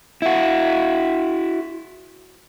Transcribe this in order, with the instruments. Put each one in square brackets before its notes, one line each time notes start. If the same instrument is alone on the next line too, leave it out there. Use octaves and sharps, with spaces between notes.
[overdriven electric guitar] E4 F#4